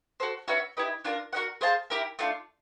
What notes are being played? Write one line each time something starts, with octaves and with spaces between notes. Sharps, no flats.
F#4 A4 C5
C#4 F#4 B4 E5
E4 G4 B4 D#5
D4 F4 A#4
F#4 A#4 D#5 F#5
G#4 C5 F5 A5
E4 G4 A#4
A3 D4 F4